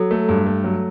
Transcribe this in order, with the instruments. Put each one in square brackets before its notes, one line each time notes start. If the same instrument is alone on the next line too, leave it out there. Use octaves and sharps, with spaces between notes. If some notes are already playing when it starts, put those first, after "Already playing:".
Already playing: [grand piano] F#3 [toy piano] A4
[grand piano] A3
G2
A3
F#3